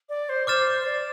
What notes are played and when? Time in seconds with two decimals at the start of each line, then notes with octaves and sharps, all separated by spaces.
0.09 D5
0.29 C5
0.47 C5 D6 F6 A6 E7
0.80 C5
0.86 D5